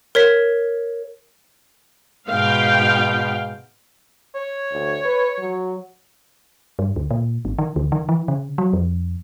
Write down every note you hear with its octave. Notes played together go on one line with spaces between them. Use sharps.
A#4 C#5 B6
G#2 B2 F5 G5
C#5
D2
B4
F#3
G2
D2
A#2
G#1
D#3
D2
D#3
E3
C#3
F#3
F2